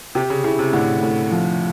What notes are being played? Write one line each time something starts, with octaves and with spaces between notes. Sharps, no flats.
C3 G4
C#3
C#3 E4
C3
A2 D3
A2
F3